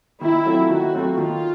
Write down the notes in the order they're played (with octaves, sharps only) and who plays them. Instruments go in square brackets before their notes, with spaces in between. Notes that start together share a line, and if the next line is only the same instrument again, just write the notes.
[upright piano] D#3 [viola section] E4
[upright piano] F#3 A3 C4 F4
[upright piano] D#3 [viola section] F#4
[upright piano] F#3 A3 C4 F4
[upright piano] D#3 [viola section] F4